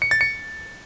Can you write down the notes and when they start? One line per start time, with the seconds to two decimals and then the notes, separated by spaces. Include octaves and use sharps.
0.02 C#7
0.11 A6
0.21 C#7